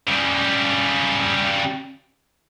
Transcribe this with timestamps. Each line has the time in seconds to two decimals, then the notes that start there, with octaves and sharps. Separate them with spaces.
0.07 C#3 G3